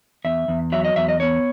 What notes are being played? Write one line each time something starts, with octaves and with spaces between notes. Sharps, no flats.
E2 E5
E2
F#3 E5
D#5
E2 E5
D#5
B3 C#5